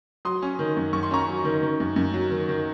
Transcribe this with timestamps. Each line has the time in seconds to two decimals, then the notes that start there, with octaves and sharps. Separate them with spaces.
0.25 F#3 C6 D#6
0.42 C#4
0.59 D#3
0.77 F#2
0.93 F#2 C#6
1.03 C6
1.11 C#4 A#5 C#6
1.28 F#3
1.45 D#3
1.63 D#3
1.80 F#2
1.96 F#2
2.14 F#3
2.30 D#3
2.49 D#3